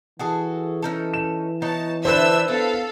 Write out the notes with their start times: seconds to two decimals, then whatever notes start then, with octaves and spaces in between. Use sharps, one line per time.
0.19 E3 F#4 G#4 A4
0.82 C#4 D#4 A4
1.14 E7
1.62 B3 D#4 C#5 A5
2.05 D3 D4 B4 C5 E5 E6
2.48 B3 E4 A4 F5